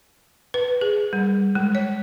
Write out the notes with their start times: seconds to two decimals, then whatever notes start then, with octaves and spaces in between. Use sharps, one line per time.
0.54 B4
0.81 G#4
1.13 G3
1.55 G#3
1.75 C#5